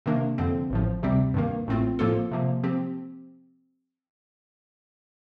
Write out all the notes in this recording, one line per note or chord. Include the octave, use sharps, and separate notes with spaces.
C3 D#3 A#3 D4
F2 D3 F3 C4
A1 A2 F3
D2 C3 G3 C4 G4
G2 D#3 A#3
A1 A2 A3 C4 F4
A2 F3 A#3 F4 A4
C3 F3 A#3
F3 C4 G4